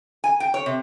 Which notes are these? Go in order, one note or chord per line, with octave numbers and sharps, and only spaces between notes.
G#5
G5
C#5
C3